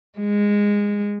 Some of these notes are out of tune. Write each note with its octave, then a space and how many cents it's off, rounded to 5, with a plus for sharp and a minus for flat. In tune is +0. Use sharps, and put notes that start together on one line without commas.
G#3 -15